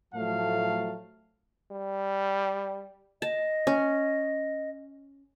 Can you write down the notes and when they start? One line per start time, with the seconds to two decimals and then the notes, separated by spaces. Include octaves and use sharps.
0.14 A2 F3 F#3 A3 F5 A5
1.71 G3
3.22 D#5 A5
3.67 C#4